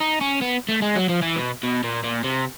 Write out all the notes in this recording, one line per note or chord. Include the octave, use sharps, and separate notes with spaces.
D#4
C#4
B3
A3
G#3
F#3
F3
E3
B2
B2
A#2
A#2
C3